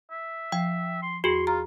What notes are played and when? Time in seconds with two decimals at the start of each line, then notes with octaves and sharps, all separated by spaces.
0.11 E5
0.52 F3 G5
1.02 C6
1.24 E2 F#4 G#4 C6
1.47 F4 A#5